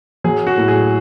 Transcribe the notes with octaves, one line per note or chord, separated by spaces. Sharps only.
F#3 G#4
F#4
A2
G#4